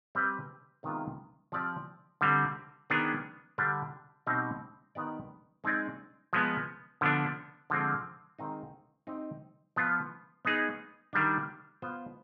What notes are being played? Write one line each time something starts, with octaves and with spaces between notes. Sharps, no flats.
G3 C4 G4 B4
C3 D#3 G#3 B3 F4
F3 C4 G4 D5
D3 G3 C4
D#3 B3 D4 G#4
D3 G3 D4 G4
B2 G3 C4 D#4 G4
D#3 B3 D#4 G4 D5
G#3 C4 D#4 G#4 D5
F3 G#3 B3
D3 F3 B3 D4
D3 F3 G#3 C4
D#3 G#3 C4 D#4
C4 D#4 G4
F3 B3 F4
B3 D#4 G#4
D#3 G3 D4
B3 F4 C5